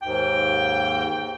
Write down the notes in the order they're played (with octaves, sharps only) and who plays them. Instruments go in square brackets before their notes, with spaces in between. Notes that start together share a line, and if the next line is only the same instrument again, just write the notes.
[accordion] D#2 G#2 [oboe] G5